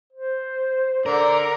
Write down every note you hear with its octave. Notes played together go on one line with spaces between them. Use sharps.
C5
D3 A#4 D5